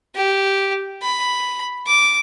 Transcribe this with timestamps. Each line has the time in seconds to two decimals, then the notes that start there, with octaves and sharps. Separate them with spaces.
0.15 G4
1.02 B5
1.86 D6